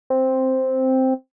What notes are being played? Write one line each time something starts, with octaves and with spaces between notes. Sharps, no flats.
C4